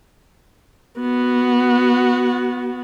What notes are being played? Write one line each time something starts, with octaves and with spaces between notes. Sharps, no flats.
B3 F#4